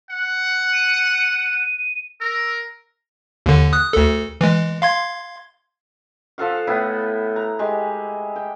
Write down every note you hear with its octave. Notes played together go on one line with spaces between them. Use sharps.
F#5
D#7
A#4 E6
D#2 D3
D#6 F#6
D2 A4
E3 G#3
F5 C6 G#6
F3 A4 F5 F#5
A2 B3 E4 B5
A#5
G#3 G4
G5